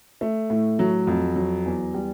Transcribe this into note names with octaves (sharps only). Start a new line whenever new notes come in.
A3
A2
F#3
F2
F#3
E2
G3